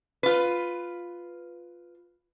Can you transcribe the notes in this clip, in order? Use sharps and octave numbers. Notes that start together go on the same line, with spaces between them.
F4 B4